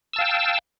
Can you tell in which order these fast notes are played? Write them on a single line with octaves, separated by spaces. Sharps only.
E6 A5 F5 G5